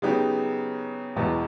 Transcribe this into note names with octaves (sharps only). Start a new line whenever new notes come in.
C#3 F#3 B3 D#4 G4
E1 E2 B2 F#3